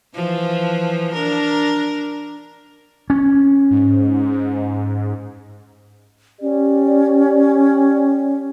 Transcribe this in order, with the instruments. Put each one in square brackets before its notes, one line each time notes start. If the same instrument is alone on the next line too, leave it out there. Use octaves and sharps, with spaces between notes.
[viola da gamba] E3 F3
D4 A#4
[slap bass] C#4
[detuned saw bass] G#2
[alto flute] C#4 [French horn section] G4 D5